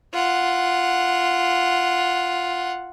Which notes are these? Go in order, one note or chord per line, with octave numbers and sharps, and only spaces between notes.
F4 F#5